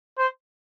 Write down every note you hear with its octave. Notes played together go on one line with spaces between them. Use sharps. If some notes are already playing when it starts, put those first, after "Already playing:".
C5